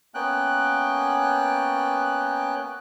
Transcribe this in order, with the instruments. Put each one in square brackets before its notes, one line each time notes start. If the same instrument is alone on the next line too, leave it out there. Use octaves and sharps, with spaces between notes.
[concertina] A#3 B3 C#4 G5 F#6